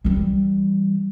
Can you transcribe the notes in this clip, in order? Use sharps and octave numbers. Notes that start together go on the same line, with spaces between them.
E3 G3